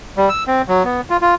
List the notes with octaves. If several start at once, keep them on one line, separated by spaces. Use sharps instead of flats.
G3
E6
C4
F#3
B3
F4
F4